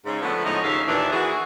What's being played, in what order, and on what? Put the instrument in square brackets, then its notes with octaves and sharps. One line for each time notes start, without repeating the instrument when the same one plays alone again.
[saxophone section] G#2 C#3
D3 F3 A3 B3
A2 F3 G#3 C#4 D#4
D#2 G#2 C#3 C#4 E5 F5
D#2 A#2 E3 D4
E3 F#4 G#4